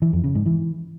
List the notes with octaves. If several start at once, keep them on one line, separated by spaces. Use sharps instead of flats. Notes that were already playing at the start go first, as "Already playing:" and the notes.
E3
F2
C#3
G#2
E3